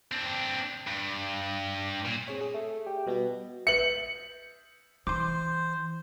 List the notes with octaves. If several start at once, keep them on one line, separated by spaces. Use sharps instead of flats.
C4 D4
G2
A#2
C4 G#4 C#5
G#4
A3
G4
B2 G3 B3 F#4
B4 E5 C#7 F#7
E3 C5 C6 D6